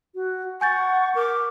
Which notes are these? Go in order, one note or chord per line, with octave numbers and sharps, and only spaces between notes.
F#4
F#5 G#5 C#6 G6 A6
A#4 D6